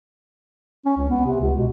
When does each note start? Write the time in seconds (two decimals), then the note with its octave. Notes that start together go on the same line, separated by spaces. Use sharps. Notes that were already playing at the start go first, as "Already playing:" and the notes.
0.86 C#4
0.98 C#2
1.10 B3
1.26 C3
1.40 C#2
1.58 B2